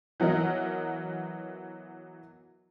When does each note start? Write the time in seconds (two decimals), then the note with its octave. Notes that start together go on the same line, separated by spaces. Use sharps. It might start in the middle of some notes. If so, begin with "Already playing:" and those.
0.20 E3 F#3 B3 A#4 D#5